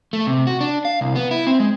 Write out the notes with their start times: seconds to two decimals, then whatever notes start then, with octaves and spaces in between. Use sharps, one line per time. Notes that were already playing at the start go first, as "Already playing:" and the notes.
0.13 A3
0.27 C3
0.47 F#4
0.61 D4
0.85 F5
1.01 C2
1.16 B3
1.31 E4
1.47 C4
1.60 G#3